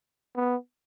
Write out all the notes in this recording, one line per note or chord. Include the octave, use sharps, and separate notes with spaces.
B3